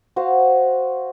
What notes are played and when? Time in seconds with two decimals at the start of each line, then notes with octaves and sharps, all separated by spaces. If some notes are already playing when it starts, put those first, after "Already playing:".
0.16 F#4 C5 F5